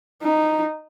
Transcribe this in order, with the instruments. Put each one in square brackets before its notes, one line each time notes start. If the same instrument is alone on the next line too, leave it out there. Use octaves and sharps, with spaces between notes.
[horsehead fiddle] D#4